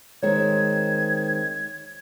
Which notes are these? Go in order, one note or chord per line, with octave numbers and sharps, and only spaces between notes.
D#3 G#3 C4 C#5 G#6